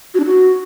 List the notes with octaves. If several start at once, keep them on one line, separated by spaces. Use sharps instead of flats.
F#4
D4
F#4